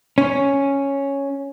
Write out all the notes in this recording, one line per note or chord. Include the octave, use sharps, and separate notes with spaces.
C#4